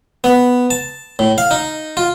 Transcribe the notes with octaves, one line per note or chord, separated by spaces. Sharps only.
B3
A5
A2
F5
D#4
F4